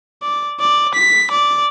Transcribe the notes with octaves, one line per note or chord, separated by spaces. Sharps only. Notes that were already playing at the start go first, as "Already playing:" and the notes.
D5
D5
B6
D5